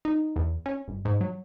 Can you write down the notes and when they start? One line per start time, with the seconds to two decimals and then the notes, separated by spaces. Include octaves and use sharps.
0.05 D#4
0.36 E2
0.66 C#4
0.88 G1
1.05 G#2
1.21 F#3